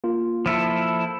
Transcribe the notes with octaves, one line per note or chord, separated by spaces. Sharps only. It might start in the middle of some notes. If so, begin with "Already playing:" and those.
A#3 F4
F3 E4 A4